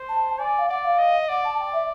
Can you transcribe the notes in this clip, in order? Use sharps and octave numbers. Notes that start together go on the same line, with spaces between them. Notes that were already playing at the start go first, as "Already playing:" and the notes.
Already playing: C5
A5
D5 G#5
F5
D5 F#5
F5
D#5
D5 F#5
A5
G5
E5